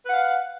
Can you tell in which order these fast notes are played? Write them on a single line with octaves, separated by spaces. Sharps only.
B4 F#5 F5